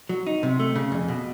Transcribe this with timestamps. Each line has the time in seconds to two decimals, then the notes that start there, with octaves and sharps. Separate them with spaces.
0.09 F#3
0.27 D#4
0.43 C3
0.60 A3
0.76 C#3
0.92 F2
1.08 B2